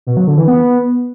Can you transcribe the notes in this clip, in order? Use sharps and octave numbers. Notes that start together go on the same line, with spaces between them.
B2
F#3
D3
E3
B3